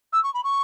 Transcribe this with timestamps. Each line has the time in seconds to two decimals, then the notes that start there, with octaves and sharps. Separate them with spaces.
0.12 E6
0.23 C#6
0.34 B5
0.44 C#6